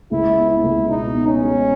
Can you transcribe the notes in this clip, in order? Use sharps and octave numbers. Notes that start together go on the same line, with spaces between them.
C#2 E4
B3
E4
C#2
B2 D#4
B3
C#4
G#3